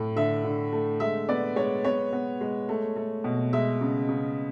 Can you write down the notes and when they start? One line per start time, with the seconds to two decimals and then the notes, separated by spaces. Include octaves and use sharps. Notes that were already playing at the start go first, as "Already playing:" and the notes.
Already playing: A2
0.16 D3 E5
0.44 D3
0.73 A3
1.00 G#3 E5
1.29 B3 D5
1.56 G#3 C#5
1.84 B3 C#5
2.12 B3
2.41 G#3
2.69 A3
2.96 A3
3.24 B2
3.53 G#3 E5
3.81 C#3
4.09 C#3